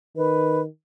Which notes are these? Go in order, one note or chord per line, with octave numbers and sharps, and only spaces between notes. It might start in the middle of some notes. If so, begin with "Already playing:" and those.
D#3 B4